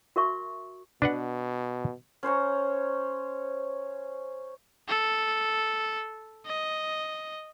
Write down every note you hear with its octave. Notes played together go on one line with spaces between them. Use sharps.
F#4 A#4 E5 C#6
B2 D4 B4 F#5
C#4 C5 C#5 A#5
A4
D#5